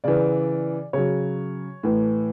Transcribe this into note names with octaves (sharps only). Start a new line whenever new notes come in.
C#3 E3 D5
C#3 F#3 C#5
A2 E3